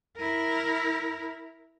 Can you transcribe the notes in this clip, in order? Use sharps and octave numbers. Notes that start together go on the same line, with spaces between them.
E4 A#4